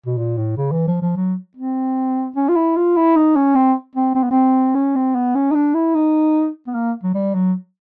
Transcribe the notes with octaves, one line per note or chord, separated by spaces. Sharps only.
B2
A#2
A2
C#3
E3
F3
F3
F#3
C4
C#4
F4
E4
F4
E4
D#4
C#4
C4
C4
C4
B3
C4
C#4
C4
B3
C#4
D#4
D4
E4
D#4
B3
A#3
F#3
G3
F#3